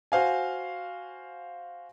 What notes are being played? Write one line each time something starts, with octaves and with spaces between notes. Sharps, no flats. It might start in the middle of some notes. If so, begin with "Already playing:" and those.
F#4 C5 F5 G#5